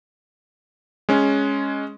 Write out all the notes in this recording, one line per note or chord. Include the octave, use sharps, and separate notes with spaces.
G#3 C#4